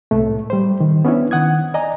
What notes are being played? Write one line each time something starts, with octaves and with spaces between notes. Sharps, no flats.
C2 A2 A3
G3 C5
D#3
B3 C#4 D4 E4
D#3 F#5 D#6 G#6
D5 D#5 G#5 A#5